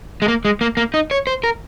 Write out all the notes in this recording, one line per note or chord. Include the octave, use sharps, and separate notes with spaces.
G#3
A#3
G#3
A#3
A#3
D#4
C#5
C5
A#4